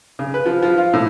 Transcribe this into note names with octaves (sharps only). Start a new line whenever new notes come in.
C#3
B4
F3
F3
F4
A2